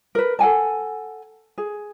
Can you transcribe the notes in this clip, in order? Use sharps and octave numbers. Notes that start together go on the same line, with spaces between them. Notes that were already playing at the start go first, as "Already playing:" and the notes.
A#4 B4
A4 F#5 G#5 A5
G#4